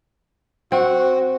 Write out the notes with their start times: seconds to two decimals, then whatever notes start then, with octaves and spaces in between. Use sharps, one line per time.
0.72 C4 F#4